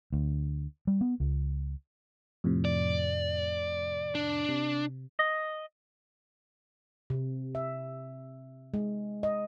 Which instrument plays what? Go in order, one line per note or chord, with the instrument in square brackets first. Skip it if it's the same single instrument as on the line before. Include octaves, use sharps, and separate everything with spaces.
[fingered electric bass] D2
G3
B3
C#2
[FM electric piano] F2 A2 C3
[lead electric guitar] D5
D4
[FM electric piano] C3
[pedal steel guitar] D#5
[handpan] C3
E5
G#3
D#5